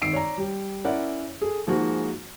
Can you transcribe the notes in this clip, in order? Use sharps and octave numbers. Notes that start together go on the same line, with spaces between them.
G#1 E6 C7 D7
C#5 D5 A#5
G3
C#4 E4 A#4 D5 F#5
G#4 A4
G#2 F3 G#3 A#3 F#4